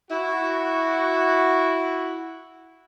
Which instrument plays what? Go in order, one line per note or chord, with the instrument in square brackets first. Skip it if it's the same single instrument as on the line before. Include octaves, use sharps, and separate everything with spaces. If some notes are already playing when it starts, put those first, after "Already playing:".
[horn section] E4 F#4